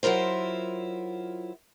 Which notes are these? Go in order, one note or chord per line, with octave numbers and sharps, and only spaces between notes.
F#3 E4 F4 A#4 C5